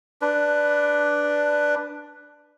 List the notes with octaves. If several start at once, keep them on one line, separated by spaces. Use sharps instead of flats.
D4 B4